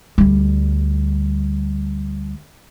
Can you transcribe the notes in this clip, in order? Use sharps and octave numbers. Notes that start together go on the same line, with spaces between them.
D2 G3